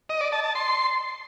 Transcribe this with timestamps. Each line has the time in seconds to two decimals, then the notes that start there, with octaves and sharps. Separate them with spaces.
0.09 D#5
0.21 D5
0.32 A5
0.44 A5
0.55 C6